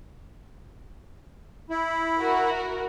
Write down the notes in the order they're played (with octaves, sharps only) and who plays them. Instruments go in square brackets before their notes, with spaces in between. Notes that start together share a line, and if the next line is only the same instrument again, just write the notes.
[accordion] E4
[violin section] F#4 A#4